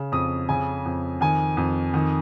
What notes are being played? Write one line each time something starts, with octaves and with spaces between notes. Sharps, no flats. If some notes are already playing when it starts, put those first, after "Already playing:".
Already playing: C#3
F2 D#6
C#3 G#5
F2
D#3 G#5
F2
D#3